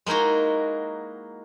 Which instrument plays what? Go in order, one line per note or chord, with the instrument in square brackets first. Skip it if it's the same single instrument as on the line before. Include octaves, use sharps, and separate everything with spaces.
[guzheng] G#3 A#3 D#4 E4 F#4